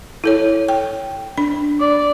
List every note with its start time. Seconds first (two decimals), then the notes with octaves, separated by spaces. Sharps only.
0.24 E4 A4 C#5
0.69 G5
1.37 D4 B5
1.80 D5